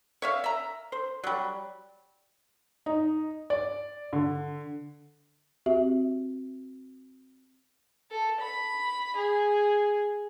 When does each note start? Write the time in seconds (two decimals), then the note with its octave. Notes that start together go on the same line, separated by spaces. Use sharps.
0.22 C#5 E5 F5
0.44 E5 A#5
0.92 C5
1.24 F#3 G3
2.86 D#4
3.50 D5
4.13 D3
5.66 C4 F#4 G4 E5
8.11 A4
8.41 B5
9.16 G#4